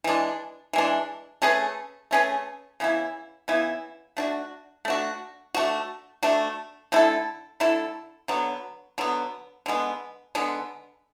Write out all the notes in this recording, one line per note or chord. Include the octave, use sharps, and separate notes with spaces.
E3 G#3 D4
E3 G#3 D4
A3 C#4 G#4 B4
A3 C#4 G#4 B4
C#3 E3 B3 E4
C#3 E3 B3 E4
A3 D4 F#4
A3 D4 F#4
A3 D4 F#4
A3 D4 F#4
D3 A3 E4 A4
D3 A3 E4 A4
D3 F#3 B3
D3 F#3 B3
D3 G#3 B3
D3 G#3 B3